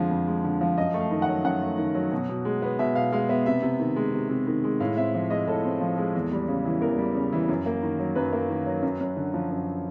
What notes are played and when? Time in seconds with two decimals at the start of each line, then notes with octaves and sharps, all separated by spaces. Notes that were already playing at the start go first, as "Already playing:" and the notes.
Already playing: F2 D3 F3 G#3
0.11 F2
0.27 G#3
0.44 D3
0.61 F3
0.78 F#2 D#5
0.94 A3
1.00 F5
1.11 D#3
1.22 F#5
1.28 F#3
1.44 F#2 F#5
1.62 A3
1.78 D#3
1.94 F#3
2.12 B2
2.29 B2
2.45 G#3
2.62 B3
2.79 B2 E5
2.95 B2 F5
3.12 G#3 F5
3.29 B3 E5
3.46 C3 E5
3.62 C3
3.80 D#3
3.96 G#3
4.14 C3
4.30 C3
4.47 D#3
4.64 G#3
4.80 A2 F5
4.97 C4 E5
5.14 F3 E5
5.30 G#3 D#5
5.47 A2 A4
5.64 C4
5.81 F3
5.98 G#3
6.15 E2
6.32 G3
6.48 C#3
6.65 E3
6.81 E2 A#4
6.98 G3
7.15 C#3
7.32 E3
7.49 F#2
7.66 A#3
7.83 D#3
7.99 F#3
8.15 F#2 B4
8.32 A#3
8.50 D#3
8.66 F#3
8.83 F#2
9.01 F#2
9.17 D3
9.34 F3
9.50 F#2